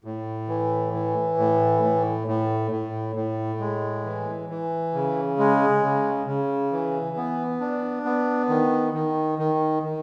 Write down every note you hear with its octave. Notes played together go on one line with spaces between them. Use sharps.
A2
E3
E3
A2
A2
A2
A2
A2
G#3
E3
E3
C#3
G#3
C#3
C#3
E3
B3
D4
B3
D#3
D#3
D#3
D#3